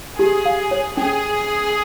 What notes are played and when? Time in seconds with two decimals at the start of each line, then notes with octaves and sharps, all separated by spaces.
0.18 G4 G#4
0.45 F5
0.71 C#5
0.97 C#4 G#4